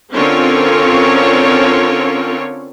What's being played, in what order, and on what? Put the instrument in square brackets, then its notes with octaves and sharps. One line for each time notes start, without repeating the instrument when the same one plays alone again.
[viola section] D3 C4 C#4 F4 A#4 C#5